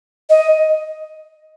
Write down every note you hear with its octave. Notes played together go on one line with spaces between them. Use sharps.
D#5